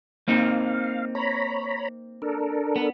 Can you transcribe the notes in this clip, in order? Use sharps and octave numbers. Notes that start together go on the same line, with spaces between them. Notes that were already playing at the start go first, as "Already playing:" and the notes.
A#3 C4 D#4 F5
C#5 A#5 B5
D4 A4 A#4
B3